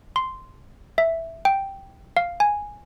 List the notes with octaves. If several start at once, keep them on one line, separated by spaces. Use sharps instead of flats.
C6
E5
G5
F5
G#5